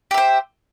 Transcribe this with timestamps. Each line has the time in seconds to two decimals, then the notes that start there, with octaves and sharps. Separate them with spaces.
0.11 G4
0.14 E5
0.18 C5